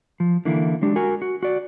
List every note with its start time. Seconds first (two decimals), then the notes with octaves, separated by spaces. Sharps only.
0.20 F3
0.45 D3 E3 A#3 E4
0.82 F#3 G#3 D4 G4
0.96 F#4 A#4 G#5
1.22 F#4
1.43 F#4 D5